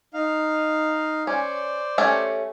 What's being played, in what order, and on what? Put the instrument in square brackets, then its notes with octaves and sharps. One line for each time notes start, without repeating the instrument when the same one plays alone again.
[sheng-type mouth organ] D#4 F5
[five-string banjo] C#4 [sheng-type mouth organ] C5 D5
[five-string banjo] A3 C#4 G4